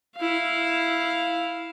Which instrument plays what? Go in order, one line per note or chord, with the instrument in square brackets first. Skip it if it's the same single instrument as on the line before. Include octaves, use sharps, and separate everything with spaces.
[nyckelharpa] E4 F5